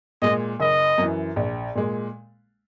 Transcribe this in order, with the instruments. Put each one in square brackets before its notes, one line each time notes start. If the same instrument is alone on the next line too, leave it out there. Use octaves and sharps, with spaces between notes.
[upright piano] A#2 G#3 [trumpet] D#5
[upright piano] F#1 [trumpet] D#5
[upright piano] F#2
E3
A#1
A#2 G#3